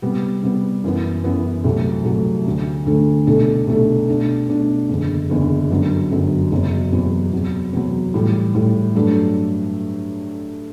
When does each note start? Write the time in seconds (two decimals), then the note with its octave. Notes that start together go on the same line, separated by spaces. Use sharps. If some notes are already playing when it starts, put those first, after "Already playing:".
0.02 C3 G3 B3
0.43 C3 G3 B3
0.84 F#2 E3 B3
1.24 F#2 E3 B3
1.64 C2 C3 F#3 A3
2.05 C2 C3 F#3 A3
2.46 D2 D3 A3
2.86 D2 D3 A3
3.27 C2 B2 A3 D4 A4
3.67 C2 B2 A3 D4 A4
4.08 B2 A3 D4
4.49 B2 A3 D4
4.89 F#1 E2 D3
5.30 F#1 E2 D3
5.71 G1 F#2 D3 F#3
6.11 G1 F#2 D3 F#3
6.52 F#1 E2 C3 F#3
6.92 F#1 E2 C3 F#3
7.32 E2 C3 F#3
7.73 E2 C3 F#3
8.14 A2 E3 G3
8.55 A2 E3 G3
8.95 G2 F#3 A3 D4